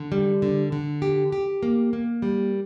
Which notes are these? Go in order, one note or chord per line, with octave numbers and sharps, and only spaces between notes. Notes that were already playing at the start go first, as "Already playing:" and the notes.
Already playing: D3
G3
D3
D3
G4
G4
A#3
A#3
G3